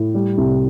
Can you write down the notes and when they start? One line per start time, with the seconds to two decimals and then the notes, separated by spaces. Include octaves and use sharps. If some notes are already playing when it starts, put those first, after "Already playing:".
Already playing: A2
0.14 G3
0.38 C2